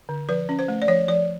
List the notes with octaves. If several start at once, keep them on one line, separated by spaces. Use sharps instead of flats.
D3
F3 B4
C#4
C5
A3
D5
F3 C#5
F3 D5